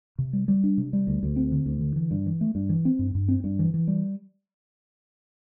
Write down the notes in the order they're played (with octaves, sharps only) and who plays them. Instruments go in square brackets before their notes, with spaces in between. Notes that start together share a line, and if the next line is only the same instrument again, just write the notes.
[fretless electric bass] C3
G3
G3
D4
C3
G3
D2
D2
C4
D3
D2
D3
E3
G2
E3
A3
G2
E3
C4
G2
G2
C4
G2
E3
E3
G3